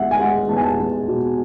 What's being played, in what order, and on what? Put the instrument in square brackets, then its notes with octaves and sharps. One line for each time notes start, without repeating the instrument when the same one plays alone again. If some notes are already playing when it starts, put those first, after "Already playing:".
Already playing: [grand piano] E2 G#3 E5 F#5
G#5
G#3 F#5
E2 A5
G#5
A5
E2
B2